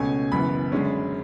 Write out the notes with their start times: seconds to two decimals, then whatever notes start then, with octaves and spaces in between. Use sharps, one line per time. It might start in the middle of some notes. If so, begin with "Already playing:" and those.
Already playing: C#2 B2 A3 C#4 G#5
0.32 F#1 F#2 E3 B3 B5
0.72 F#2 D3 G#3 C#4